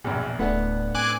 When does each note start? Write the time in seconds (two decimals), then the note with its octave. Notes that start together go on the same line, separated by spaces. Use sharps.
0.04 A#1 E2 B2
0.39 D1 A2 A3 B3 D4 F#5
0.95 C4 G#5 D6 F#6